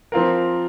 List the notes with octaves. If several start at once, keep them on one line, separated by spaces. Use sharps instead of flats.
F3 C4 F4 A#4